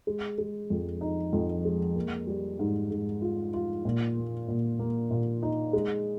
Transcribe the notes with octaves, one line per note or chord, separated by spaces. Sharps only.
G#3
G#3
F2
D#4
F2
G#3
A#3
G3
G#2
G#2
F4
F4
A#2
A#3
A#2
A#3
A#2
D#4
G#3